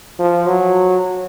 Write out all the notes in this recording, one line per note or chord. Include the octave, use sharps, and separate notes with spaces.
F3
F#3